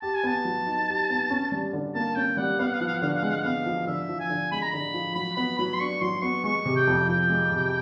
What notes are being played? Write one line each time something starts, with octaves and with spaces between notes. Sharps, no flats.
G4 A5
G#5
B3 A5
F#3
D#4
G4
B3
C#4
G3
D3
A#3 A5
C#4 G5
G3 F#5
B3 F5
F#5
F5
F3 F#5
F5
F#5
D3 F5
F#5
F5
G#3 F#5
F5
F#5
B3 F5
F3
D3 E5
F3
G#5
D3
G#3 B5
A#5
D3 B5
F3
F#3 B5
B3 B5
F#3 B5
C6
D4 C#6
F#3 C6
B3 C#6
G#3 C#6
C3
G5
F2
F3 G5
G#3
C3